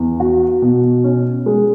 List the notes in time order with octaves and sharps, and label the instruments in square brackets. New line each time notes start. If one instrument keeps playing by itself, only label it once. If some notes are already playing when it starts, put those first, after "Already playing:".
Already playing: [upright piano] E2
F#4
B2
C#4
G#3